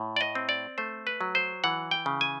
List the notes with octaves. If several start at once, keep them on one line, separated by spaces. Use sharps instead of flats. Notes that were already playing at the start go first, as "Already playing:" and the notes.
Already playing: A2
D5
D#5
C4
D5
A3 C5
B4
F#3
C5
E3 F#5
G5
C#3
G#5